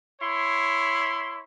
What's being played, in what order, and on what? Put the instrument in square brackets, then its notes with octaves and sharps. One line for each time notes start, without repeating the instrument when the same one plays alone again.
[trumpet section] E4 C#5 C6